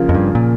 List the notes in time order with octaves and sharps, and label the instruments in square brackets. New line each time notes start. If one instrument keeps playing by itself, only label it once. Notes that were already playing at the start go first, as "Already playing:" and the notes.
Already playing: [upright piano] C#3 F3 A#3 F4
[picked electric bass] F2
G2
A#2